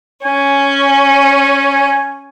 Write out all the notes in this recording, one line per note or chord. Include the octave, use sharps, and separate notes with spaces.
C#4 G#5